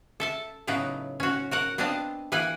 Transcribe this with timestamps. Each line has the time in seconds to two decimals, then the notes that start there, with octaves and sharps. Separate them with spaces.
0.20 A4 E5 A5
0.67 A2 C#3 F#3 B3 D#4
1.20 C#4 F#4
1.51 F#4 A#4 F#5
1.78 B3 C4 D4 D#5 F5 A5
2.32 E3 A#3 B4 F#5 G#5